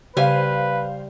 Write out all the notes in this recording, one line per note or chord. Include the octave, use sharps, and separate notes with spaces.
C#3 G3 B4 C5 F5 G#5